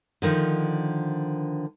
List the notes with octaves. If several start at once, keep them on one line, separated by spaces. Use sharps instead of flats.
D3 D#3 F3